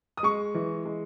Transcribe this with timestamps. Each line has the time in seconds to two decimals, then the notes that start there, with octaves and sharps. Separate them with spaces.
0.17 D#6
0.23 G#3 C#6
0.55 E3
0.85 G#3